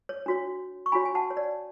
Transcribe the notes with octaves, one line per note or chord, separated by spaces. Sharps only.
C#5
D4 F#4 C#5
C#6
D4 F#4 C#5 G#5 B5
G#5
F#5 A5
C#5
D5